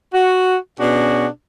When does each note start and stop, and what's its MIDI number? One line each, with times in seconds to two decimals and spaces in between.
0.13 0.56 66
0.79 1.26 47
0.79 1.26 61
0.79 1.26 62
0.79 1.26 66
0.79 1.26 68